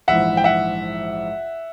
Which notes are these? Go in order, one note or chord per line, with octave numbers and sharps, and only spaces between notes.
A#1 G#2 E3 E5 F#5
G5
E5 F#5